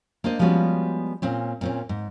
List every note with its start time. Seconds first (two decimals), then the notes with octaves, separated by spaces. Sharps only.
0.24 A#3 D4 C5 D#5
0.39 F3 G3 G#3 B3 C#4 F#4
1.22 A#2 C4 C#4
1.61 A#2 C4 C#4
1.89 G#2